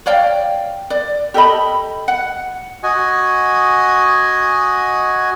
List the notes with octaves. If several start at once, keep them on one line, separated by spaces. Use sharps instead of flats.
C#5 D5 F5 G5
D5
G4 A4 D#5 B5
F#5
F#4 D#5 G#5